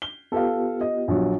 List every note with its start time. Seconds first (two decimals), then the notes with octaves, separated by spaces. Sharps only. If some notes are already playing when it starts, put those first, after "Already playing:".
0.02 G7
0.32 B3 F4 G4 A4 F5
0.81 D#5
1.08 A#1 F#3